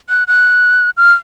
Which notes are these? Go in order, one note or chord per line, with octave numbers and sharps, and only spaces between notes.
F#6
F#6
F6